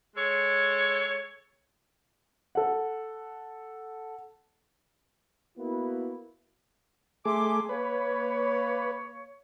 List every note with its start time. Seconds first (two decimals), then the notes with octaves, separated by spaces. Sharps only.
0.16 G#3 A4 C#5
2.55 A4 F#5
5.57 A#3 B3 E4 F#4
7.25 A3 G#4 E5 C6 D6
7.69 A#3 B4 C#5